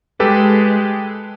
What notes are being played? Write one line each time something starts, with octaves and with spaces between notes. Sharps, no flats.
G#3 G4 A4 B4